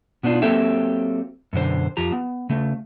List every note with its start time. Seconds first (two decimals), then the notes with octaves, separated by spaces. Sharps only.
0.23 B2 B3 D4 D#4 F4
0.42 F#3 A#3 C4 G4 A4 E5
1.53 F#2 B2 D3 C5
1.97 F2 F3 G4 A#5
2.12 B3
2.50 C#3 A3